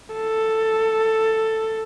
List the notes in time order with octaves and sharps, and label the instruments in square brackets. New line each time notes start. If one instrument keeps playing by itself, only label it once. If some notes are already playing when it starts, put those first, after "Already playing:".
[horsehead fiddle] A4